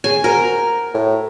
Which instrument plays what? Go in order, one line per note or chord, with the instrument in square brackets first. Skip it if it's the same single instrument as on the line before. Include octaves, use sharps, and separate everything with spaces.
[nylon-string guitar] G#4 C#5 [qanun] G#5
[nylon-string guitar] F#4 C5 [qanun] A#4
[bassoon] A2